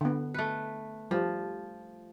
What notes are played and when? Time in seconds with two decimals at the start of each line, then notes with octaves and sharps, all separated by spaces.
0.01 D3 B3
0.34 A3 B4
1.11 F3 G3